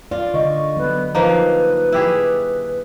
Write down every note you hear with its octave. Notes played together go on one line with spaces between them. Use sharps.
F4 D5
D3 D#5 C#6
F#3 B3
F3 A#3 D#4 B4
E4 G4 G#4